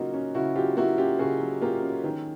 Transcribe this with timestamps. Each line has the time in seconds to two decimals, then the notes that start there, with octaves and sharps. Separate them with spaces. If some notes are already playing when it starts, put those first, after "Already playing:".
Already playing: C#3 F#3 A#3 C#4 D#4 F4 F#4
0.14 C#4
0.34 C#3 E4 F#4
0.55 F#3 F4 G4
0.77 A#3 E4 F#4
0.98 C#4 F4 G4
1.19 C#3 F#4 G#4
1.41 F#3
1.62 A#3 F4 G4
1.82 C#4
2.04 D#3